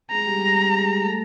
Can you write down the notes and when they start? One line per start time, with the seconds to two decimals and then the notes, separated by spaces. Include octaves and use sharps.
0.11 G#3 G#4 A#5
0.26 G3 G4
0.41 G3 G4
0.79 G#3 G#4
1.02 A3 A4